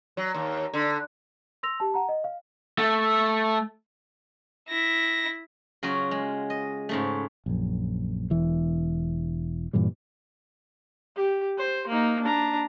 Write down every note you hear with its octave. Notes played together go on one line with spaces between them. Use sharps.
F#3
D#2
D3
C6 E6 A#6 F7
G4 A5
F#5 A#5
D#5
F5
A3
E4 A#6
C#3 F#3 F4 F#4
G#3
D#5
G#2 C#3 A3
A#1 F#2
E1 E3
G2 A#2 E3 G3
G4
C5
A#3 D#4
D4 A#5